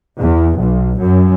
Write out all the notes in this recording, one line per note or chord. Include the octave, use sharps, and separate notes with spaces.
E2
B1
F#2